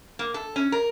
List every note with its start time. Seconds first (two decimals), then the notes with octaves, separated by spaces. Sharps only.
0.19 A#3
0.34 A4
0.56 C#4
0.72 A#4